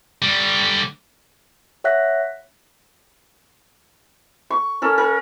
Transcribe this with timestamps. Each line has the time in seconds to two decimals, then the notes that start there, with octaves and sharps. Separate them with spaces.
0.22 D3 G3
1.84 C#5 E5 F#5 F#6 A#6 B6
4.50 C#6
4.82 C#4 A4 A#4
4.98 A#4